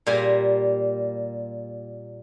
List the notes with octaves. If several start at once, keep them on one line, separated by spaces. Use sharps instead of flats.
A#2 G3 A#3 G#5